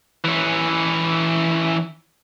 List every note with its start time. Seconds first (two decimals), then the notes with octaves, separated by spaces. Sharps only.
0.24 E3 C#4